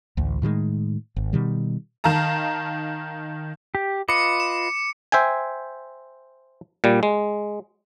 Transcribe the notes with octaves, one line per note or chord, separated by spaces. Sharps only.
A1 D2
A2 D#3 F3 G#3
G#1
B2 D#3 G3
D#3 F5 A5 A#5
G4
F4 B4 D#5 D6 C#7
E7
C5 E5 G5 G#5
A#2 G3
G#3